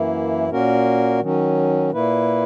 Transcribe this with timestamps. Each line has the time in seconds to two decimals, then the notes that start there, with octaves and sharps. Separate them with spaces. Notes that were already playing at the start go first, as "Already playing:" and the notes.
Already playing: F#2 E3 A#3 E4
0.50 A#2 A#3 C#4 F#4 A#4
1.20 D#3 F#3 C#4
1.92 A#2 A#3 E4 B4